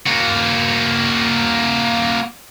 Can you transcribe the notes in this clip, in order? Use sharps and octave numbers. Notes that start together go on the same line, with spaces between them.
A#3 F#4